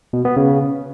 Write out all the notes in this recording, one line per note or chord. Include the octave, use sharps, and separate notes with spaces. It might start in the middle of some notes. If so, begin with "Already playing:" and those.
B2
B3
C#3